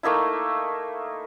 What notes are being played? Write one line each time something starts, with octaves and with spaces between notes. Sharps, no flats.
A3 A#3 D#4 E4